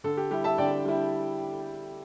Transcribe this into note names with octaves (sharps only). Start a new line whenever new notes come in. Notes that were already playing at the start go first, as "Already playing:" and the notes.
D3 A4
G4
G3 E4 G4
E5 A5
D3 D5 G5
G3 E4